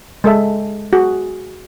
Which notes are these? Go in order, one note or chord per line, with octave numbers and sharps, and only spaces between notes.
G#3 A4 E5
F#4 G#4